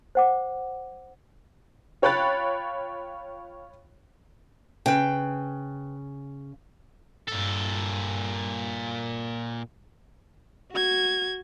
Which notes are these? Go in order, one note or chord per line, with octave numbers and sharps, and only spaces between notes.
C5 F#5 D6
F4 C#5 G5 B5 F#6 A6
C#3 B4 G5
G2 A#2 A4
F#4 G#6